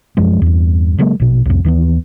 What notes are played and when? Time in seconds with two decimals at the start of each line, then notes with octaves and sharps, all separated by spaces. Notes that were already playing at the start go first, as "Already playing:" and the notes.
0.17 F#2 F3 G#3
0.42 E2 G2
0.98 C#3 F#3 G#3 A#3
1.20 A#1 B2
1.46 C2 F2
1.65 D#2 E3 A3 B3